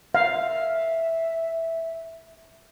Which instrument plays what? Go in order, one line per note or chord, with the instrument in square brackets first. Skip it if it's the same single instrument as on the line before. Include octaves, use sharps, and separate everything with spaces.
[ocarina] E5 [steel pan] F5